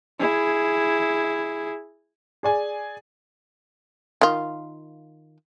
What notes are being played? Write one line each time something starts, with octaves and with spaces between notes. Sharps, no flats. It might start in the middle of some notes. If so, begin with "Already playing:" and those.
E4 G#4
G#4 D5 G#5
D#3 F4